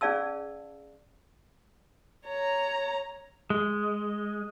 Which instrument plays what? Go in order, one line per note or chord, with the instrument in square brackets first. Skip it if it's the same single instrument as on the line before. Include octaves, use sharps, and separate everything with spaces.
[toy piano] C#4 G#4 D5 F5 A5 E6
[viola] C#5 A#5
[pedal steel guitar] G#3